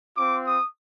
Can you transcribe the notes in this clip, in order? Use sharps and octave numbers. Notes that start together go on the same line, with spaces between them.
C4 F4 D6
D#6